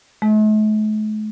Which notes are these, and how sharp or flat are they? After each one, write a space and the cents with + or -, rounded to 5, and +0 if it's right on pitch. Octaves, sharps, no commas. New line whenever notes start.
A3 -45